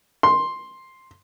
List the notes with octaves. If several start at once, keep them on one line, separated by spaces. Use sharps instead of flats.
C6